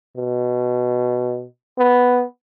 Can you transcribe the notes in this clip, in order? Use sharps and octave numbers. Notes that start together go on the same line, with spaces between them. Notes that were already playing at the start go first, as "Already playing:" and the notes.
B2
B3